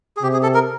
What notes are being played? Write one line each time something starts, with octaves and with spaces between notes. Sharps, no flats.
G#4
C3 G4
G#4
A4
A#4